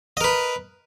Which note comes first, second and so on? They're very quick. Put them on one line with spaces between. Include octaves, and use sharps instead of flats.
D#5 A#4 B4